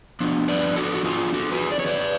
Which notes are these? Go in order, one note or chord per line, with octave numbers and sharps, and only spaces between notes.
F3 B3 D4
B4 D5
F#4 A4
F#4
F4 G#4
F#4 A4
G#4 B4
D5
C#5
B4 D5